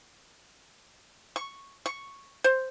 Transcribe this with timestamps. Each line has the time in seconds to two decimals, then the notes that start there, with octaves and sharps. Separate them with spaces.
1.36 C#6
1.86 C#6
2.44 C5